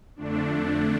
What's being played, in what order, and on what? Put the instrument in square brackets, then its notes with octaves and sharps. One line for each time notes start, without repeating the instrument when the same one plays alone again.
[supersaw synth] F2 D3 A3 D4